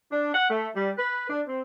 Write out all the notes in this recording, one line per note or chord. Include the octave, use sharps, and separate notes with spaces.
D4
F#5
A3
G3
B4
D4
C4